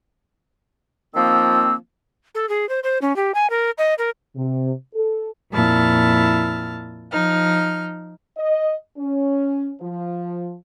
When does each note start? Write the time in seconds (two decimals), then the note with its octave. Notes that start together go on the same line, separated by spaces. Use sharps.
1.14 D#3 F3 A#3 C4 E6
2.35 A4
2.49 G#4
2.69 C5
2.84 C5
3.02 C#4
3.16 G4
3.35 G#5
3.50 A#4
3.78 D#5
3.98 A#4
4.36 C3
4.94 A4
5.52 F2 A#2 E4 A5 F6
7.11 F3 D#4 F6
8.37 D#5
8.98 C#4
9.81 F3